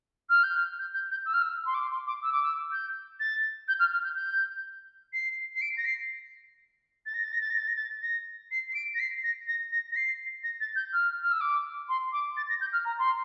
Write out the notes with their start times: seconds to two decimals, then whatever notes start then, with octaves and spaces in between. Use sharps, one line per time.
0.29 F6
0.43 G6
0.56 F6
0.79 G6
0.94 G6
1.11 G6
1.26 E6
1.33 F6
1.42 E6
1.66 C6
1.74 D6
1.90 C6
2.07 D6
2.23 E6
2.32 D6
2.43 E6
2.72 G6
3.20 A6
3.68 G6
3.79 F6
3.92 F6
4.04 G6
4.16 G6
5.13 C7
5.55 C7
5.61 D7
5.77 A#6
5.85 C7
7.06 A6
7.14 A#6
7.24 A6
7.32 A#6
7.41 A6
7.50 A#6
7.58 A6
7.68 A#6
7.76 A6
8.02 A#6
8.51 C7
8.70 C7
8.74 D7
8.94 A#6
9.00 C7
9.23 A#6
9.47 A#6
9.71 A#6
9.92 A#6
9.96 C7
10.43 A#6
10.60 A6
10.76 G6
10.93 F6
11.22 F6
11.32 E6
11.41 D6
11.89 C6
12.12 D6
12.37 A6
12.49 A#6
12.61 G6
12.73 F6
12.85 A#5
12.99 C6